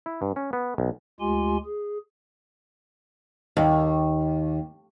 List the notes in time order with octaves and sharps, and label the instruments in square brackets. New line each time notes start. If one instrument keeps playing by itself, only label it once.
[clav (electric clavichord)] E4
G2
C#4
B3
B1
[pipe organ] D2 G#3 F4 G4 G#5 C6
G#4
[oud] D#2